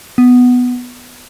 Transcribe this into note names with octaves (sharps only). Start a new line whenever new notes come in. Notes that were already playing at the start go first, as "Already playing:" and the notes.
B3